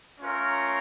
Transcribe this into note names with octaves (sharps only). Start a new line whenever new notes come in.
A3 C#4 F4 A#4 C#5